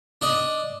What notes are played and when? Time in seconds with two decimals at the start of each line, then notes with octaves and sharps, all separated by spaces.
0.21 D4 D#5